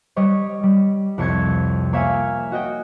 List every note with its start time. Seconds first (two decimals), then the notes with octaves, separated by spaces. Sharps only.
0.16 G3 C#5 D#5
0.63 G3
1.18 C2 F2 C#5 A5 C#6 G#6
1.93 A#3 C#5 E5 F5 G#5
2.52 F#4 D#5 G5